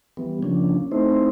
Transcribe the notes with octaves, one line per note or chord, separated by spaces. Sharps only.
E3 G3 B3
C#3 F3 A#3 C#4 D4
A3 C4 D#4 E4 C5